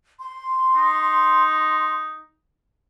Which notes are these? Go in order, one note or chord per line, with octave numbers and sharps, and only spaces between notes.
C6
D#4